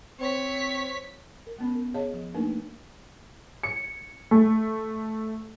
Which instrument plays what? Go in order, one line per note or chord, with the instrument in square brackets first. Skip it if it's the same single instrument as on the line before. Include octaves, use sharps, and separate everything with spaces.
[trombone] C4 [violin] C#5 B6
[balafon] A#4
G#3 B3 C#4
A#4
G#4 C#5 D#5 F5 A5
F3
A3 A#3 D4 D#4 A#4 B4
[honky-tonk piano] C#7
A3